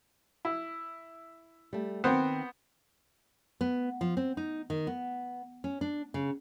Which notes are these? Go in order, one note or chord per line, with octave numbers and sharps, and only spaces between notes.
E4
G3 A3
D#3 B3 C4 C5 F#5 G5
B3
F3
C4
D#4
D#3
B3
C#4
D4
C#3